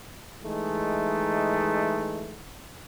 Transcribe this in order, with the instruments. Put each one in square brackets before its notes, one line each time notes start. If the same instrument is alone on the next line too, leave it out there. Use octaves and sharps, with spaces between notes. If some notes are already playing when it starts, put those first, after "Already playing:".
[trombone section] E3 G#3 A3 D#4